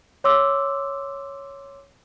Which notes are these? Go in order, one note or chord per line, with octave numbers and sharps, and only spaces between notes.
C#5 C6 D6 E6